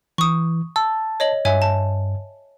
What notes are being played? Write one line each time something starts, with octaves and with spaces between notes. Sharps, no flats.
E3 C#6 D#6
A5 E6
C#5 D#5 F#7
G2 C#5 E5 G#5
A5